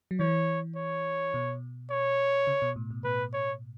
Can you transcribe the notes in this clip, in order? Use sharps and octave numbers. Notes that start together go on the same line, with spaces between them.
F#3
E3 C#5
C#5
B2
C#5
C#3
B2
A2
B2
B2 B4
C#5